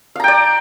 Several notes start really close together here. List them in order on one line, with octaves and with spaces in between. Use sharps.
F5 A#5 G5 D5